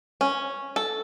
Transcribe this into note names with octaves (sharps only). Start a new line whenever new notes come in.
C#4
A4